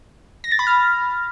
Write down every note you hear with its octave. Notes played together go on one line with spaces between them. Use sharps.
A#6
A6
B5
F6